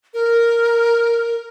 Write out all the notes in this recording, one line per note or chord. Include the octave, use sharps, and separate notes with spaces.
A#4